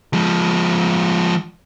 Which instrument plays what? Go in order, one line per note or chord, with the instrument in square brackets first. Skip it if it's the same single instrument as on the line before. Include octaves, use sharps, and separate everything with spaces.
[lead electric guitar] F3 G#3